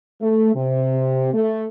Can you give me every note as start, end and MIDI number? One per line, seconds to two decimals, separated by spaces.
0.21 0.51 57
0.55 1.31 48
1.33 1.67 57